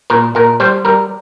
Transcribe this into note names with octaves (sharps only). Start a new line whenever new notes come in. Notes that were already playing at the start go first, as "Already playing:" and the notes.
A#2 A#4
A#2 A#4
G3 C5
G3 A#4